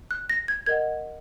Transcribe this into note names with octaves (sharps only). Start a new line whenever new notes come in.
F#6
A#6
G#6
A#4 D#5 F#5 G#6